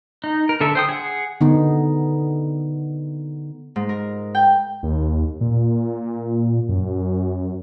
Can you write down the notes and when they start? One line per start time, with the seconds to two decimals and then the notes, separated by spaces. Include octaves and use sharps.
0.24 D#4
0.49 A#4
0.61 D3 A4 E5
0.75 C5 G5 D#6
0.89 G#4 F#5
1.41 D3 B3 D#4
3.76 G#2
3.89 A#4
4.35 G5
4.83 D#2
5.41 A#2
6.69 F#2